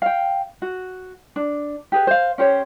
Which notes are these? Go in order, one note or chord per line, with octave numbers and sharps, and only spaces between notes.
F5 G5
F#4
D4
G4 G#4 B4
C5 F5
C#4 G4 C5 C#5